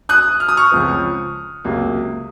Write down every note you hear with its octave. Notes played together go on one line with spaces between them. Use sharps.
D#6 F#6
F6
D#6
C#6 F6
C#2 C#3 F3 C4
C#2 C3 F#3 A#3